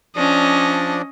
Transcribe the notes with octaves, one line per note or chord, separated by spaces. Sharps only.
F3 C#4 D4 D5 D#5